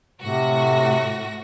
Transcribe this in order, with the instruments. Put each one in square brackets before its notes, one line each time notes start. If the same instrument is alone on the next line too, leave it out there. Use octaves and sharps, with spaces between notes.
[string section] A2 F#4 A#6 [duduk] C3